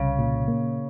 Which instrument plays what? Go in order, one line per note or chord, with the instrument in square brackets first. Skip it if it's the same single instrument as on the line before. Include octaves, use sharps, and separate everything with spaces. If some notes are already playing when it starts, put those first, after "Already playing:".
Already playing: [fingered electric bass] C2 [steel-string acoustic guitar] C#3
[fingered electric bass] A#2
A#3